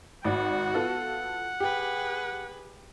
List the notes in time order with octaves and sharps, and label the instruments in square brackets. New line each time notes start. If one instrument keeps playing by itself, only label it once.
[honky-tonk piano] G#1 D5 [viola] F#4 [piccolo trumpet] F#5
[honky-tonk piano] B3 F4 A4
[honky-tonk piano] G4 [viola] G#4 B4